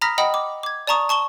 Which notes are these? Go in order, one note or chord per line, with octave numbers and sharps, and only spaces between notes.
A#5 B5 D#6 F6 A#6 B6
D#5 F#5 G5 B5 D#6
D6
D6 G#6
D5 A5 A#5 C#6 D#6
A5 C#6 E7 G7